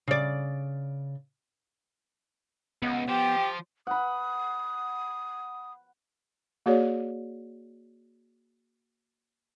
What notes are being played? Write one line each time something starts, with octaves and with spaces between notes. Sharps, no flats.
C#3 D5
C#2 B3
F3 G4 G5
F#5 B5 D#6
A#3 F#4 G#4 C#5 D5